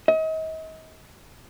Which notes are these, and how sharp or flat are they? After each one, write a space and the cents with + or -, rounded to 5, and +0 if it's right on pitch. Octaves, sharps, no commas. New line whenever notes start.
D#5 +40